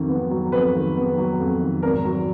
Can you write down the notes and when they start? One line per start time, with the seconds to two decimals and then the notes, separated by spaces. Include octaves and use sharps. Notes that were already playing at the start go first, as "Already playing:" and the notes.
Already playing: F2 D#3 F#3
0.09 B3
0.31 F#3
0.52 F2 B4
0.74 D#3
0.97 B3
1.18 F#3
1.40 F2
1.61 D#3
1.83 G#1 A#4
2.05 F#3